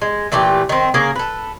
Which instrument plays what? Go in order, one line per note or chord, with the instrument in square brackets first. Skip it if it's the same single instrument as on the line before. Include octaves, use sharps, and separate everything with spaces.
[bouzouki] G#3
A#2 E3 A3 G4
D#3 C4
C#3 A#3 G#4
A4 B4